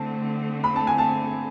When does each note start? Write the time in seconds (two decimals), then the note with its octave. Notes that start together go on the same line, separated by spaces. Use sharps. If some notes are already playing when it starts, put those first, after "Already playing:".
Already playing: D3 A3 C4 A5
0.64 B5
0.76 A5
0.87 G#5
0.98 A5